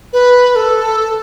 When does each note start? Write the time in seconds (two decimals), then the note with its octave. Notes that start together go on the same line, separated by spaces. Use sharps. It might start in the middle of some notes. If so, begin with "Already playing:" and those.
0.13 B4
0.56 A4